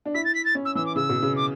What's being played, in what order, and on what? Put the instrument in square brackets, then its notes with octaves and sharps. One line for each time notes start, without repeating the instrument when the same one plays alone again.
[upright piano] D4
[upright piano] E4 [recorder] B6
[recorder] A6
B6
A6
[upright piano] C#4
[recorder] E6
[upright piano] E3 [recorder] E6
[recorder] D6
[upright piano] C#3 [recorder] E6
[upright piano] B2
C#3
[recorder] D6